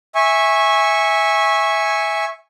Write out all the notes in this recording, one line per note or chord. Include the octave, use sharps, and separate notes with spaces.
E5 G#5 C#6